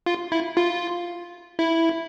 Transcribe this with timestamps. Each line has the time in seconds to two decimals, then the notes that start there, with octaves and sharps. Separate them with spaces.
0.06 F4
0.32 E4
0.57 F4
1.59 E4